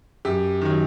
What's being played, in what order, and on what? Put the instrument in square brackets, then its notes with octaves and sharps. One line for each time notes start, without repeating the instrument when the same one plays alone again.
[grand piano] F#2 G4
D#3 F#3